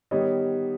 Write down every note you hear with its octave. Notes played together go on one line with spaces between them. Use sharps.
D#3 G3 B3 C#5 D#5